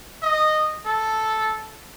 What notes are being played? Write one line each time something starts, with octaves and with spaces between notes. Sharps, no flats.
D#5
A4